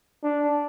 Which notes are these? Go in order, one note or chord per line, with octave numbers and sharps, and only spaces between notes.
D4